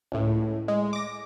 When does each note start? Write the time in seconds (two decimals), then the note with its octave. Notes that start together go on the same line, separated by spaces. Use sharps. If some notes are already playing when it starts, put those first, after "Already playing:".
0.12 C#2 A2
0.68 G#3
0.93 D6 A#6